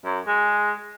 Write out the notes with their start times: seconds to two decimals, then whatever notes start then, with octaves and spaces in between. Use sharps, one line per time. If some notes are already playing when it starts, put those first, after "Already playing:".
0.05 F#2
0.27 G#3